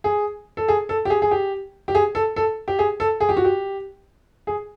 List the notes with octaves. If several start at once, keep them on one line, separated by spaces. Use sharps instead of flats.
G#4
A4
G#4
A4
G4
G#4
G#4
G4
G4
G#4
A4
A4
G4
G#4
A4
G#4
G4
F#4
G4
G#4